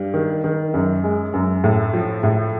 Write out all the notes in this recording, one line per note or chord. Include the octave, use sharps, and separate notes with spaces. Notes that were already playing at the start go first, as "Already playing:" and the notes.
Already playing: G2 G3
D#3
D#3
F#2
G#3
F#2
A2
F3
A2